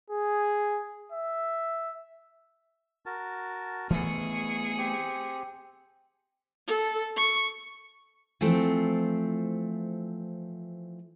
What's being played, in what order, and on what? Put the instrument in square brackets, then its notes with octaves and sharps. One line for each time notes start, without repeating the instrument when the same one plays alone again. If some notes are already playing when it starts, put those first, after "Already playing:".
[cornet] G#4
E5
[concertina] F#4 A#4 A5
[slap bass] E3 A3 B3 [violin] G#4 C#7 [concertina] C#6
[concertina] C4 G4
[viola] A4
C#6
[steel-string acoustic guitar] E3 F3 A3 C4